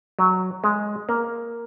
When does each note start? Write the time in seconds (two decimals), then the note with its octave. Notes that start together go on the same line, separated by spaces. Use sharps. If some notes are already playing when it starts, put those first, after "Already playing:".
0.19 F#3
0.64 G#3
1.09 A#3